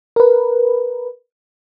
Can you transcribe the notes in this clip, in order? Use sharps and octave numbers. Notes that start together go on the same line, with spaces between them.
A#4 B4